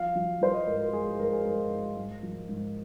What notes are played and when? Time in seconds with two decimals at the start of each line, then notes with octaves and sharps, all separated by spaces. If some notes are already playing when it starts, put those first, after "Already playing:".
Already playing: F3 F5
0.15 F3
0.42 F3 C5
0.54 D#5
0.67 G#2 A#4
0.80 A#4
0.93 G#2 G#4
1.06 G#4
1.19 G#2 A#4
1.33 G#4
1.45 G#2 A#4
1.70 G#2
1.97 G#2
2.23 F3
2.49 G#2